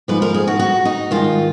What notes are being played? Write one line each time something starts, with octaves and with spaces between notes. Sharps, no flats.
G#2 F3 B4
A#4
G#4
F#4
F#4
D#4
G#2 D#3 F4